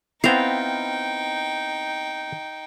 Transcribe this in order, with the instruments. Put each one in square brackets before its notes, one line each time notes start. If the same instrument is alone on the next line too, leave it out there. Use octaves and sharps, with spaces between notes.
[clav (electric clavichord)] B3 C4 E4 [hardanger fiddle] D#4 G5 [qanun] F5 A#5